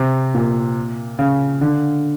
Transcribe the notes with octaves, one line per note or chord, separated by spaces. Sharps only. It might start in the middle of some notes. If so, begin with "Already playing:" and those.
Already playing: C3
A#2
C#3
D3